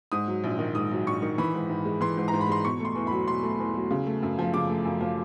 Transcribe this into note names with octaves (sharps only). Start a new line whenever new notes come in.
G#2 D#6
F#3
A#1
D#3
G#2 D#6
F#3
A#1 C#6
D#3
E3 B5
G#2
G#2
G#3
E3 C6
G#2
A#5
G#2
B5
G#3 C6
B2 C#6
A3 C6
E2
F#3 B5
B2 C6
A3
E2
F#3
C#3
A3
F#2
F3
C#3 D6
A3
F#2
F3